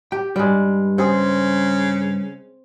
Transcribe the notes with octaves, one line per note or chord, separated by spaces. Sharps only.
G4 G5
G2 G3 G#3
C#3 C4 G#4